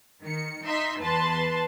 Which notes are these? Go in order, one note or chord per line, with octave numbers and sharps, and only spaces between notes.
D#3 C#7
D#4 E5 C6 B6
E2 B4 A5 C6